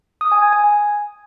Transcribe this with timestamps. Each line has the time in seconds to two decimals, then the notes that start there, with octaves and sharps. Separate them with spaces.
0.21 D#6
0.32 G#5
0.42 G#6
0.53 G#5